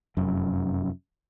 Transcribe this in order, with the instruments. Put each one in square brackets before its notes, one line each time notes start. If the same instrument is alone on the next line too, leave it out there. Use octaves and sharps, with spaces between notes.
[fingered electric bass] F1 F#2